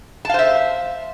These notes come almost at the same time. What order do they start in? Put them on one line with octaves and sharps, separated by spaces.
A5 F5 C5 E5